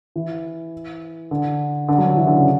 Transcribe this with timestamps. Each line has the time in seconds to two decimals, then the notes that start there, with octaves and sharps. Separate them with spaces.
0.16 E3
1.31 D3
1.88 D3
1.98 F#3
2.07 D3
2.17 E3
2.27 D3
2.36 C#3